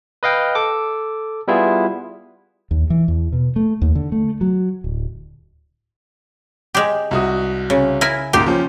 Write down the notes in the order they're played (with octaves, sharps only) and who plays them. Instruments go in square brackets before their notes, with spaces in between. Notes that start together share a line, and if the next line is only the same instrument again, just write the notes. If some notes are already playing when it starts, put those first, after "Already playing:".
[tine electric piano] B4 D#5 F5 G5
A4 D6
G3 B3 E4 F4 G#4
[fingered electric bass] D#2
E3
E2
B2
A3
D#2
D3
A3
F#3
D1
[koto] G#3 G4
[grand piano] C2 F#4 D#6
[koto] C#3
E4 A#4 G#5
[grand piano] C#2 G#2 A#3 [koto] G4
[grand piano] F3 C#4